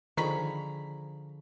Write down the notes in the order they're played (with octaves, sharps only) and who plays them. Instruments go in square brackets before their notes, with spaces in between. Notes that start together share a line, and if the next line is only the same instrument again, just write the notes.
[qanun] D3 F3 G#4 [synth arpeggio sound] D#3 B6 [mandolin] A#5 B5 C#6